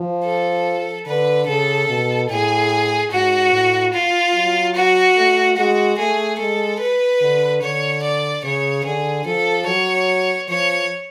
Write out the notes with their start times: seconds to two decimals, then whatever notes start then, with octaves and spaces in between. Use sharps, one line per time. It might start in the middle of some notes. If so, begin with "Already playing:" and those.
Already playing: F3
0.25 A4
1.06 D3 B4
1.47 C#3 A4
1.89 B2
2.29 A2 G#4
3.11 G#2 F#4
3.53 A2
3.94 F4
4.35 F#3
4.75 F#4
5.16 A3
5.57 G#3 F#4
5.98 A3 G#4
6.39 G#3 A4
6.80 B4
7.21 D3
7.62 D3 C#5
8.03 D5
8.44 C#3 C#5
8.85 D3 G#4
9.26 F3 A4
9.67 F#3 C#5
10.49 F3 C#5